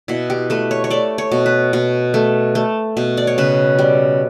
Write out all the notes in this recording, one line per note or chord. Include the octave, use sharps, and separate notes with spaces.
B2 E4
G4
A3 B4
C#5
C#5
A3 D5
C#5
B2
B4
B2
A3
A3
B2
D5
C#5
C#3 B4
G3